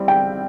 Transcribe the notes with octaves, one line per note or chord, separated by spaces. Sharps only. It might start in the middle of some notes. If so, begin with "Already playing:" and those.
Already playing: G3 C4 E4
G5